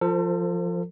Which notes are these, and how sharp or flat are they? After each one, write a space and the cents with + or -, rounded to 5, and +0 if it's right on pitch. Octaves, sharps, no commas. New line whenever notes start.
F3 +0 A4 +40 C5 -20